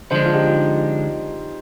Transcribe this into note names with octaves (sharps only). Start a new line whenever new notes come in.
D3 F3 G#3 D4 C5 D#5
F4
D#4 G4
F4
D#4